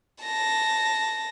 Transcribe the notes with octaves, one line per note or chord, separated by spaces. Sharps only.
A5 A#6